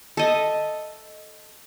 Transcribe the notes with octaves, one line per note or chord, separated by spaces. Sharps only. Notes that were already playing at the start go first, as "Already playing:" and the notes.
A4 D#5 E5